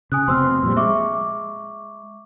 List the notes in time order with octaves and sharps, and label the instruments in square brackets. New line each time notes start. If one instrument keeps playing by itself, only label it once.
[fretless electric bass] C#3 [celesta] G#5 D#6 F#6
[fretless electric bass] F1 B2 C4 [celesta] C6 E6 F6
[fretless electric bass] A#2 F3 G3
[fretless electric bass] G#3 [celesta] E5 C#6 D6